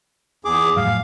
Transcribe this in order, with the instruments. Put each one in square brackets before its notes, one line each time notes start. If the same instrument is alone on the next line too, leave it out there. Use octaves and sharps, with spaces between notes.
[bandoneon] E2 G#4 D6
[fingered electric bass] F2 A2 F#3 [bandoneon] F5